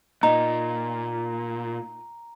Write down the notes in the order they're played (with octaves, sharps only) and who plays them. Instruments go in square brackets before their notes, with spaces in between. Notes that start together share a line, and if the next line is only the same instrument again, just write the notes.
[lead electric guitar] A#2 [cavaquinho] D#4 [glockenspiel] A#5